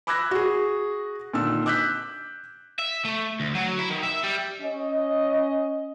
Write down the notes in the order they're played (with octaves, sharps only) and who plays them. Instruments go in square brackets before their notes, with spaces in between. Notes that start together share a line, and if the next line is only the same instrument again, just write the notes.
[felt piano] B5 D6 E6 F#6 G#6 A#6
F#4 G#4
A#2 D3 D#3 E6
D6 E6 F#6 G6 B6
[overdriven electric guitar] E5
A3
D2
F#3
E4
D#3
E5
G3
[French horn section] C#4 D#5